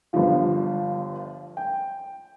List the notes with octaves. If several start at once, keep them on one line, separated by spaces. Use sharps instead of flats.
G1 G2 F3 F4
G5